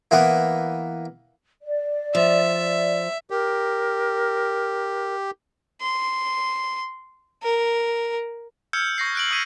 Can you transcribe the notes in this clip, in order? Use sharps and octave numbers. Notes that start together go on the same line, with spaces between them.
E3 A#3 B3
D5
F3 E5
G4 A#4
C6
A#4
E6 F6 G6 G#6 C#7
C#6 A#6 C7
F#6 D7 F#7
C#6 D#6 F6 G#6 B6 D#7